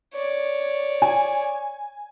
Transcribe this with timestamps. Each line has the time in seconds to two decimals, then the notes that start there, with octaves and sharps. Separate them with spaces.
0.14 C#5 D5
1.02 G#5